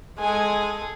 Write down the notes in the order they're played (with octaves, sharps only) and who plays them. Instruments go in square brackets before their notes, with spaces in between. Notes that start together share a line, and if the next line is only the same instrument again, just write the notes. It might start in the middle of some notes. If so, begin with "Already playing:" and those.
[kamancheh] G#3 G#5 [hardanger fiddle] G#4 A4